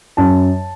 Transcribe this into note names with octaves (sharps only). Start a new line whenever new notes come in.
F#2 A5